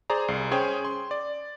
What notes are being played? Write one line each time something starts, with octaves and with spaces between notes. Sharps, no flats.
G#4 C5 D5 A#5
C2 C7
C#4 G#4 C5 C#5 G5 G#5
C6
D5